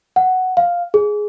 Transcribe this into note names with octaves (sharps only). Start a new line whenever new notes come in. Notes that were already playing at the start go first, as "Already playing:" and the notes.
F#5
F5
G#4